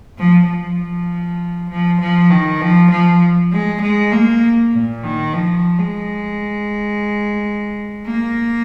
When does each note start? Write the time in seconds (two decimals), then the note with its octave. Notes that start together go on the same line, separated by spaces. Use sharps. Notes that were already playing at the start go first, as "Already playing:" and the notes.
0.18 F3
0.49 F3
1.70 F3
2.01 F3
2.30 D#3
2.61 F3
2.91 F3
3.52 G#3
3.82 G#3
4.12 A#3
4.73 A#2
5.04 D#3
5.33 F3
5.79 G#3
8.06 A#3